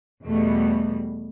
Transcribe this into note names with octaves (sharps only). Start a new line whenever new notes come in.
E2 B2 G3 A3